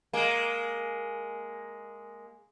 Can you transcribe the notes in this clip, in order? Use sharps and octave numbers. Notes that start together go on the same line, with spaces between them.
G#3 A#3